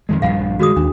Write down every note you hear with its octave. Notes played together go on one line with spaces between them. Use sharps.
F2 D#3 G#3
A#1 G2 F3 F5 F#5
D#3 G#3 F#4 G#4 D#6
D#2 D4